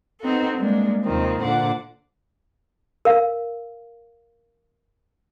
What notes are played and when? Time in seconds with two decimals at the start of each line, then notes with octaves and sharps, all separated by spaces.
0.22 B3 C4 D#4 F#4 A4
0.57 G3 G#3 A#3 D4
1.03 D#2 C3 D#3 F3 C4
1.41 A#2 D3 C5 F#5 D6
3.05 A#4 F5